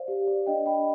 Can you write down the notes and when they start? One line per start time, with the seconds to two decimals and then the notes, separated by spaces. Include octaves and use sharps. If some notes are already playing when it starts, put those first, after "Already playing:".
Already playing: C5 D5 F5
0.08 G4
0.27 D5
0.46 D4 D#5 G5
0.66 D4 G5 B5